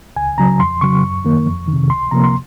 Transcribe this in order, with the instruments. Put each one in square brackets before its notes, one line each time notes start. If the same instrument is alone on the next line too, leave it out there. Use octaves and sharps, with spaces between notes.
[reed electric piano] C#2 G#5
C#3 F#3 A#5
F2 C6
C#3 F#3 C#6
F#2
D#3 A#3
F2
D#3
C3
C#2 C6
C3 F3 A#3 A#5
C6